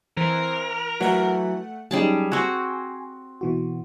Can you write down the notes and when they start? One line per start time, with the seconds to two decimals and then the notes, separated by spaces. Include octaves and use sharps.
0.17 E3 C4 A#4
1.01 E3 F#3 A3 F#5
1.91 F#3 G3 C#4 D#4 G#4 A5
2.32 C4 F#4 G#5
3.41 B2 E3 F#4